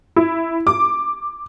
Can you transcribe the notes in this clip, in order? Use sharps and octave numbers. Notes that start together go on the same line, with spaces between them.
E4
D6